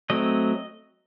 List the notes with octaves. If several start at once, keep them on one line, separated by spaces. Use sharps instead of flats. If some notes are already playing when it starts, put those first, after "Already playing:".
F#3 A3 C4 D#5